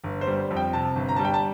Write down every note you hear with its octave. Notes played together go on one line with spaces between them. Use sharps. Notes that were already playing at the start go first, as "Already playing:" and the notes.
G1
C5
G3
F2
G5
C3 A5
G1
A#5
G3 A5
G5
A5